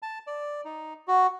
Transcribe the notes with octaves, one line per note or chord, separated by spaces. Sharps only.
A5
D5
D#4
F#4